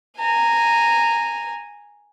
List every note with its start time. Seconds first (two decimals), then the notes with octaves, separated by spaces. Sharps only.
0.18 G#5 A#5